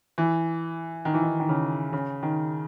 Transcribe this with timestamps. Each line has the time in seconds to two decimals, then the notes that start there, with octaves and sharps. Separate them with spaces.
0.18 E3
1.05 D#3
1.14 E3
1.23 D#3
1.40 D#3
1.49 C#3
1.93 C#3
2.23 D#3